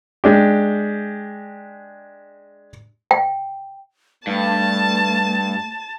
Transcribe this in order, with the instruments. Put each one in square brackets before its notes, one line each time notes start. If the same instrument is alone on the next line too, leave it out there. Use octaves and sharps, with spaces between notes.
[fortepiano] G#3 D4 G4
[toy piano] G5
[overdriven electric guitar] G2 [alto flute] A3 [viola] A5